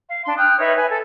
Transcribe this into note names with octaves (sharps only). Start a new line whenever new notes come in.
F5
D4 C6
G5 D#6 F6 F#6
D#4 B4 C#5 E5
B4 G#5
A4